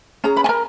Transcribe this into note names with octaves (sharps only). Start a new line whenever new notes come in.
C#4 G#4 A#5
B4 B5
G#5
A#4 A#5